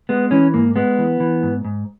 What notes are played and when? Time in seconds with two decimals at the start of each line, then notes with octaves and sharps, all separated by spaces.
0.09 G#3 B3
0.31 E3 C#4
0.54 G#2 A#3
0.76 G#3 B3
0.98 E3
1.20 E3
1.43 G#2
1.65 G#2